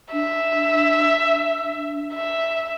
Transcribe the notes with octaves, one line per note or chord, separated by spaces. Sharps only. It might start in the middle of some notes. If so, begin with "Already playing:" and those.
D4 E5
E5